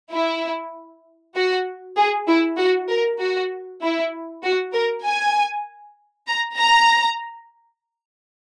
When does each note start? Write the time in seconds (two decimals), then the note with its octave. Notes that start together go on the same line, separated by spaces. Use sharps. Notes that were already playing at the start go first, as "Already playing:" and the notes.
0.12 E4
1.36 F#4
1.97 G#4
2.28 E4
2.58 F#4
2.90 A#4
3.20 F#4
3.82 E4
4.44 F#4
4.73 A#4
5.05 G#5
6.28 A#5
6.58 A#5